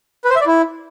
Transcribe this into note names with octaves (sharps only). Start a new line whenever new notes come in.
B4
C5
E5
D5
E4